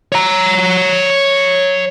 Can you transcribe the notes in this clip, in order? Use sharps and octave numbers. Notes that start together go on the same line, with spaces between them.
C#5 A#5